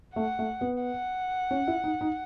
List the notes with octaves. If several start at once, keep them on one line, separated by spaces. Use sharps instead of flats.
A3 F#5
A3
B3
F#5
C#4
E4
D#4
D#4